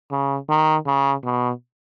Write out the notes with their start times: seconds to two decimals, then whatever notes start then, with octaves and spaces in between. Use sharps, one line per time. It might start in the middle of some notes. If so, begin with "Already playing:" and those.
0.11 C#3
0.50 D#3
0.87 C#3
1.25 B2